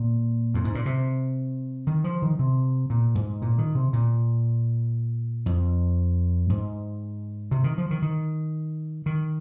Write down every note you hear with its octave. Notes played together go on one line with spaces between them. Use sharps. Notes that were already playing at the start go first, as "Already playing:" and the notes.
Already playing: A#2
F2
G#2
A#2
C3
D#3
F3
D#3
C3
A#2
G#2
A#2
D#3
C3
A#2
F2
G#2
C3
D#3
F3
D#3
D#3
D#3